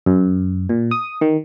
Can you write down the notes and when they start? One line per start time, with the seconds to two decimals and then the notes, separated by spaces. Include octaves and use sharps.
0.06 F#2
0.69 A#2
0.91 D#6
1.21 D#3